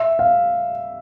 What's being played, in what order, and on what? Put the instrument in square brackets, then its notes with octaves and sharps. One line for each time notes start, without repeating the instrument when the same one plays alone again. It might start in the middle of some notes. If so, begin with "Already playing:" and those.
Already playing: [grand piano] E5
F5